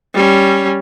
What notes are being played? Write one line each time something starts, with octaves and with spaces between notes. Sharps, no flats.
G3 C#4